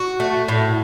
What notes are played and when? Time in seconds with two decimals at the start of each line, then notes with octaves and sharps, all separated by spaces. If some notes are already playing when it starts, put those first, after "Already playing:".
Already playing: F#4
0.20 A3
0.48 A2